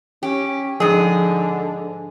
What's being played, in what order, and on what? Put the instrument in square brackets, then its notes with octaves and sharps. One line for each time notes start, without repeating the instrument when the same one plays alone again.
[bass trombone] C#4 [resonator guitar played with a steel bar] G4
[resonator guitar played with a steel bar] G#2 G#4 [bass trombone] D3 [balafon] F3